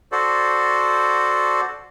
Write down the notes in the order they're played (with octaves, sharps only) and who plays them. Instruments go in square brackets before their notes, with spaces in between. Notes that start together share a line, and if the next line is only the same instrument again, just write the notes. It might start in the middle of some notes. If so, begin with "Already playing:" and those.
[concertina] F#4 A4 C5 D5